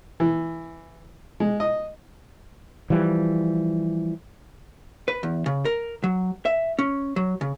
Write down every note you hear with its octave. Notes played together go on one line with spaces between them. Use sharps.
E3
G#3
D#5
E3 F3 G3
B4
E2
C#3
A#4
F#3
E5
C#4
F#3
C#3